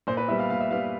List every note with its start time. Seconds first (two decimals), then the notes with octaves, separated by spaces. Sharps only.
0.07 A#2 C5
0.17 B4
0.28 G3 B3 E5
0.39 F5
0.50 A#2 F5
0.60 E5
0.71 G3 B3 F5